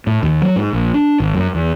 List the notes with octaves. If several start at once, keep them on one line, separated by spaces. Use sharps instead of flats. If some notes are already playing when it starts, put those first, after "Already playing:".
A2
D#2
F#3
G#2
A#1
D4
G#1
F#2
E2